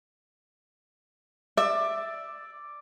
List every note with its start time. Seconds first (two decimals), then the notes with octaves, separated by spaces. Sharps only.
1.57 D5 E5